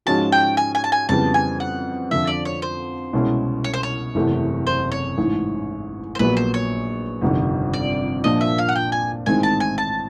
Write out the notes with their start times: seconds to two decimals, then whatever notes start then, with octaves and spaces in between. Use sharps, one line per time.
0.06 G#2 F3 G#3 C#4 F#4 A5
0.32 G5
0.57 G#5
0.75 G#5
0.84 A5
0.92 G#5
1.09 F2 C#3 E3 G3 B3 A5
1.34 G#5
1.60 F#5
2.11 F2 D3 F3 E5
2.27 D5
2.45 C#5
2.62 C5
3.13 C2 B2 G#3 C#4 E4
3.64 C#5
3.74 C5
3.83 C#5
4.15 F#1 E2 C3 E3 A3
4.67 C5
4.92 C#5
5.17 A1 G#2 E3
6.15 C5
6.19 A#1 A#2 F#3 B3 B4
6.37 C5
6.54 C#5
7.21 G1 F2 C3 D#3
7.74 D5
8.24 A#2 F3 A#3 D4 D#5
8.41 E5
8.58 F5
8.69 F#5
8.76 G5
8.92 G#5
9.26 A1 G#2 D#3 G#3 C4 G#5
9.43 A5
9.60 G#5
9.78 A5